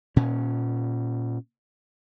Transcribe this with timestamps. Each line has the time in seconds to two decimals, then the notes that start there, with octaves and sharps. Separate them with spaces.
0.16 A#2 C#4